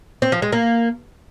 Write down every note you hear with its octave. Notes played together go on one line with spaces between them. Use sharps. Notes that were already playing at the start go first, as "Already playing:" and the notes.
C4
F3
G#3
A#3